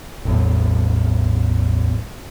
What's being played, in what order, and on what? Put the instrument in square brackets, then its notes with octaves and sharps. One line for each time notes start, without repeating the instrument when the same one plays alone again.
[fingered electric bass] A1 A2 F#3 [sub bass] E2